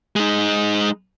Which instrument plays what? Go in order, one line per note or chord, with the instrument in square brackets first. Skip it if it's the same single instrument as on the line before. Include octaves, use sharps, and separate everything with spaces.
[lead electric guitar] G#3 D#4